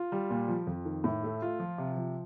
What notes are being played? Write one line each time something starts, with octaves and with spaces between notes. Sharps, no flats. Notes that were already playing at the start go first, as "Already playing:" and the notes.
Already playing: F4
G3
A#2
F3
F2
D#3
A2
A3
F4
F3
C3
F3